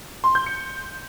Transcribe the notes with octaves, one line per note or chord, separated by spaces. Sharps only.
C6
G6
C#7